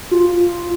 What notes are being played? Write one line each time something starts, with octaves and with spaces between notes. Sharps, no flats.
F4